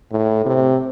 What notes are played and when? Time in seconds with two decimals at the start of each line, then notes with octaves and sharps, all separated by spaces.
0.12 A2
0.46 C3